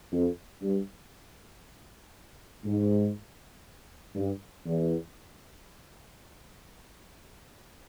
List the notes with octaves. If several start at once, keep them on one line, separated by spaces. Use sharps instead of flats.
F2
G2
G#2
G2
E2